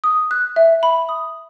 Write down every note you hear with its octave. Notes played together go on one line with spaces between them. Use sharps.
D#6
F#6
E5
B5
D#6